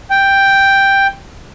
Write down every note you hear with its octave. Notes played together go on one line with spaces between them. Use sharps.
G5